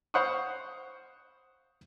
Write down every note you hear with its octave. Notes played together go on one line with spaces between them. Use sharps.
C5 F5 F#5 B5 C#6 D#6